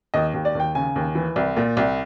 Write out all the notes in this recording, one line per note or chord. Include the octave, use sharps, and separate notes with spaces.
D#2 D#5
D#2
D5
D#2 G5
C#3 G#5
D#2
E3
C2
A#2
C2